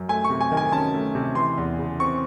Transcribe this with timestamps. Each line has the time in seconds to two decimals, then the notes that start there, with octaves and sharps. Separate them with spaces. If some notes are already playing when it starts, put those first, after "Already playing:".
Already playing: F#2
0.09 A3 G#5
0.24 C#6
0.30 C3
0.41 G#5
0.52 D#3
0.57 G#5
0.72 C#4 A5
0.94 A3
1.15 C3
1.35 E3 C6
1.57 E2
1.79 C#3
1.99 C4 C#6